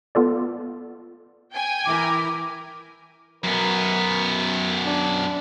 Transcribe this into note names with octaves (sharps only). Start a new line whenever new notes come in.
B3 F4 A4 D5
G5 G#5
E3 E4 A#4 D6
F#2 B3 A#4
D4